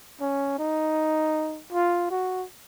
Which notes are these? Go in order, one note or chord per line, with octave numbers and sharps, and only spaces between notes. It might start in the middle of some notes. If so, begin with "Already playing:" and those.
C#4
D#4
F4
F#4